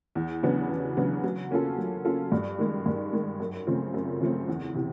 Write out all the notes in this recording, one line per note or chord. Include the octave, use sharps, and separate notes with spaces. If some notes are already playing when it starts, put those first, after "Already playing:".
E2
C#3 F#3 B3 D4
E2
C#3 F#3 B3 D4
F#3
A#3 C#4 F4 A4
F#3
A#3 C#4 F4 A4
G2
D#3 G#3
G2
D#3 G#3
F#2
C#3 F3 A3 C4
F#2
C#3 F3 A3 C4
E2
C3 E3